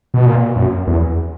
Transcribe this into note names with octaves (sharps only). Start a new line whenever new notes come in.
B2
A#2
F#2
E2